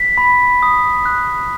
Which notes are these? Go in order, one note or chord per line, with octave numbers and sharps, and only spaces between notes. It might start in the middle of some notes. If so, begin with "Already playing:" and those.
Already playing: B6
B5
D#6
F#6